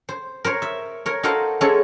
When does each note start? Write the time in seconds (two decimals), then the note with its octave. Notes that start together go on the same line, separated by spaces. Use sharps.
0.09 C5
0.45 A#4 C5 C#5
0.62 E5
1.06 A#4 C#5
1.23 D#4 F#4 A4 A#4 C5 F5
1.61 G#3 C#4 E4 G#4 A4 C5